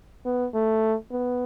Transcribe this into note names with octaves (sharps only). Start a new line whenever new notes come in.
B3
A3
B3